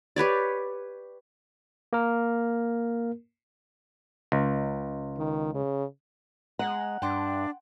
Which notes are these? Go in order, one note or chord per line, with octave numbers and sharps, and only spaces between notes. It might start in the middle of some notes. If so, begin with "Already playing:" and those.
G4 B4 C#5 D5
A#3 A#4
C#2
D#3
C#3
G#3 F#5 A#5
G2 D4 G5 C6